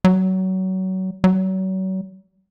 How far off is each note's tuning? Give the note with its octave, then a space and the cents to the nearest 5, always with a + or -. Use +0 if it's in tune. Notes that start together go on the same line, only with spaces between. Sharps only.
F#3 +25
F#3 +35